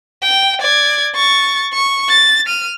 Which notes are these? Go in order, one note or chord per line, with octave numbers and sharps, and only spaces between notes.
G5
D5 G#6
C#6 A6
C#6
A6
F6 D#7